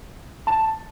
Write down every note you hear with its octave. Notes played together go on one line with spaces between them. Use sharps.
A5